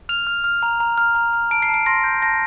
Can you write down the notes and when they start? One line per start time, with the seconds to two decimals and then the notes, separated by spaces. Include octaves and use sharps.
0.09 F6 F7
0.27 F6
0.44 F6
0.63 A#5
0.80 A#5
0.98 F6
1.15 A#5
1.33 F6
1.51 A5 D7
1.62 C7
1.69 A5
1.74 D7
1.86 C6 A#6
2.04 G6
2.22 A5 A#6